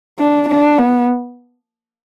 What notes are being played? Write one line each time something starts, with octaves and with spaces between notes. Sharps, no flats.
D4
D4
B3